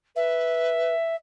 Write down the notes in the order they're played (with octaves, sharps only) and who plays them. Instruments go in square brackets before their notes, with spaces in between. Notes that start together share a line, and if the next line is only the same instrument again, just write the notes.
[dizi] B4 [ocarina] E5